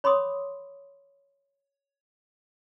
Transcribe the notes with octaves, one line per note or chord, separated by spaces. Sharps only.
C#5 B5 C6 D6 D#6